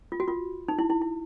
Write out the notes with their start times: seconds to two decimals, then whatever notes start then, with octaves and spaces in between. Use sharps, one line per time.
0.12 F4
0.20 F#4
0.28 F4
0.68 D#4
0.79 E4
0.90 E4
1.02 E4